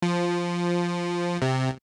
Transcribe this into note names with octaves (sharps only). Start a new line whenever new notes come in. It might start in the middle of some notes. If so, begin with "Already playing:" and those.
F3
C3